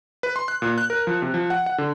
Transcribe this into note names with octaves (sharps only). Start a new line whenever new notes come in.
B4
C6
F#6
A#2
F#6
A#4
F3
C3
F3
F#5
F#5
D3